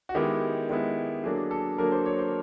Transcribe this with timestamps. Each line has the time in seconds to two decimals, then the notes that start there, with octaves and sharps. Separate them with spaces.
0.09 F#4
0.15 D#3 G#3 B3 E4 G4
0.70 D#3 G#3 B3 E4
1.24 D3 F#3 A#3 D4 G#4
1.51 A4
1.78 D3 F#3 A#3 D4 A#4
1.92 C5
2.06 C#5
2.18 C5